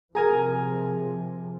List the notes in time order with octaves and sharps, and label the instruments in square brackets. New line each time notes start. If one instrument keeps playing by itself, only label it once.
[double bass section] C3 F3 [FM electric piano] G#4 [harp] A#4 G#5 A#5